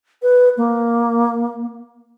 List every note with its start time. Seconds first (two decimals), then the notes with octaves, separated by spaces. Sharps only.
0.22 B4
0.57 A#3